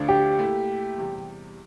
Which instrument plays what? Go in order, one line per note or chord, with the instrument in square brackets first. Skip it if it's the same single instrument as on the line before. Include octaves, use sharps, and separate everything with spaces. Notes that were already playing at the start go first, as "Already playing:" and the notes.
Already playing: [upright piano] D2 D3 F3 A3 D4
[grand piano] G4
[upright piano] A#2 A3 E4
E2 C3 G3